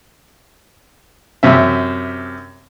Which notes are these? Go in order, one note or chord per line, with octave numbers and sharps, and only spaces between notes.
F#2 C3 E5